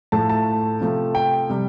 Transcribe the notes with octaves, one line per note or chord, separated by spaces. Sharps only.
A2 F3 A3 A5
A5
C3 F3 A3
G5
C3 G3